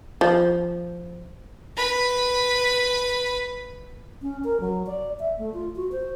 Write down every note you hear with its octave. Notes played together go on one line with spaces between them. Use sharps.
F3
B4 B5
C#4
A#4
F#3
D5
E5
A3
F4
F#4
C5